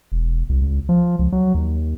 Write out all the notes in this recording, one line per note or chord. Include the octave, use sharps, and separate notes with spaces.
E1
C2
C#2
F3
C#2
F#3
D#2